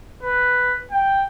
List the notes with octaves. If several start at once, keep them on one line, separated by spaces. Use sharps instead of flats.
B4
G5